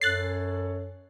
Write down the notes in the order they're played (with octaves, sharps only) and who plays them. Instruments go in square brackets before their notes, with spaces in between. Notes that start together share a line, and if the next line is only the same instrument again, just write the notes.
[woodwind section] F#2 A4 C#5 [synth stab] F#6 A6 C7